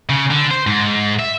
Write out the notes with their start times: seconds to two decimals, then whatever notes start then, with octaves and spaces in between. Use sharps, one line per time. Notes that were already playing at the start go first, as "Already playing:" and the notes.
0.10 C#3
0.31 D3
0.51 C5
0.67 G#2
1.19 E5